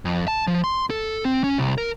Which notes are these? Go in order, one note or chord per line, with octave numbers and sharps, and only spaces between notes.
F2
A5
F3
C6
A4
C4
C#4
C2
A#4